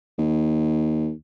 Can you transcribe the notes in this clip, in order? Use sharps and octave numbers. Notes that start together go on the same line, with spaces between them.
D#2